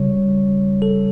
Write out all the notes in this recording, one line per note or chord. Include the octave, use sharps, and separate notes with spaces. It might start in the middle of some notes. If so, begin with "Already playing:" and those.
Already playing: C#3 G3 C#5
A4